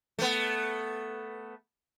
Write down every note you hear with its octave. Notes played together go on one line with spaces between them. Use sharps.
A3 B3